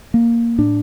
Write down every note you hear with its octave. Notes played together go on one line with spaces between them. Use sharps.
A#3
A2 D4